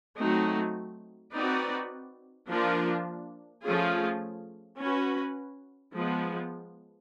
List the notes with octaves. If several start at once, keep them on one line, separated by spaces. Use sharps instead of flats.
F#3 A3 C4 D#4 F#4
C4 D#4 F#4 B4 D5
F3 A#3 D4 F4 A#4
F3 A3 C#4 F4 G#4
C#4 F#4 B4
F3 G#3 B3